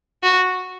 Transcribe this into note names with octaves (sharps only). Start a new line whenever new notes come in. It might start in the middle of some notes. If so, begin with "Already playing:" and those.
F#4